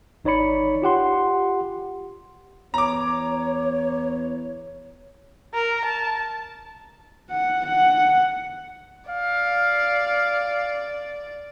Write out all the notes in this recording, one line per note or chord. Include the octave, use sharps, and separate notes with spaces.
G#1 D#4 C#5 D5 B5 C#7
F4 G4 F#5 C6
E2 C#5 A#5 D6
A#4
A5
F#5
F#5
D5 F5